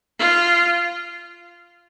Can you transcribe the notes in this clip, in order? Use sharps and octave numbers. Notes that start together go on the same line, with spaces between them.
F4